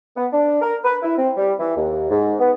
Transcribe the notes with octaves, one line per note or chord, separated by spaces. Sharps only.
B3
D4
A#4
B4
E4
C4
G3
E3
D#2
G#2
B3